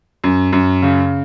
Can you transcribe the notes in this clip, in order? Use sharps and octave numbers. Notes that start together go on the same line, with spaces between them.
F#2
F#2
C#3